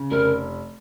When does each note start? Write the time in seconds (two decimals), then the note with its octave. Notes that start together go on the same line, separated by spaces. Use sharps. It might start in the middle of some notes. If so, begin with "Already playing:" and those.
Already playing: C#3
0.11 F1 A#4